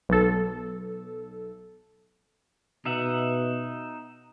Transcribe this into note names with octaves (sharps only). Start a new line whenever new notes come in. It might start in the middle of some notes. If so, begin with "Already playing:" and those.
B1 A4
B2 D#4 E5 F#5